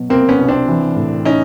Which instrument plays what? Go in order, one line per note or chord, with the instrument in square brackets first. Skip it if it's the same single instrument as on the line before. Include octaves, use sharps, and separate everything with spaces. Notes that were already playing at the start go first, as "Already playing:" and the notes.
Already playing: [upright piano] B2 F#3
[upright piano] C2 [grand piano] A#3 C4
[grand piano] B3 C#4
[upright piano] C2
[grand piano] C4 D4
[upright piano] E3
A2
[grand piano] C#4 D#4